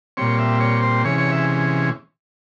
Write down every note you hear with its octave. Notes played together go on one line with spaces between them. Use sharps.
A#2 G3 C4 C#5
E5
C#5
C5
C3 E3 G#3 C#4 C#5
C#5
E5